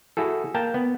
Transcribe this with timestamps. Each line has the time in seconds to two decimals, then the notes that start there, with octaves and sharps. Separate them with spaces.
0.17 E4 F#4 G#4 A4
0.54 A#3 G5 A5 A#5
0.74 B3